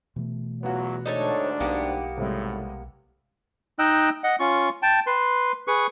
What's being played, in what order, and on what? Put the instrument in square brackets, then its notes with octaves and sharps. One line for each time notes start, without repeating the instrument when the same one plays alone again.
[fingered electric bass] B2 E3 A3
[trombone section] E2 F#3 [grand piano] B3 F4 F#4
[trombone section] D2 G#2 D4 [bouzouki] D#4 A4 C#5
[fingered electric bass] B1 [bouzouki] A#3 B3 G4 [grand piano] D#4 F#5
[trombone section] G#1 A2 [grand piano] C3 G3 G#3
[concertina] D#4 D#5 G5 E6 F#6
D#5 F#5
C#4 F4 C#6
G5 A5
B4 C6
G#4 B4 C#6